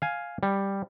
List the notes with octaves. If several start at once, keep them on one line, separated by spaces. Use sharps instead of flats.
F5 G#5
G3